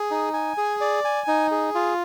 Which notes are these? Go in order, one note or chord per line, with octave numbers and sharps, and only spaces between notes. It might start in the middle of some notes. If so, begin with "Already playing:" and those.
Already playing: G#4
D#4
G#5
G#4
D5
G#5
D#4
G#4
F4